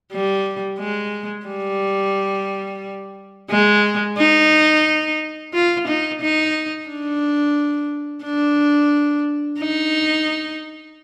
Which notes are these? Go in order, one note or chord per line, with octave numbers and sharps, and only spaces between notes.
G3
G#3
G3
G#3
D#4
F4
D#4
D#4
D4
D4
D#4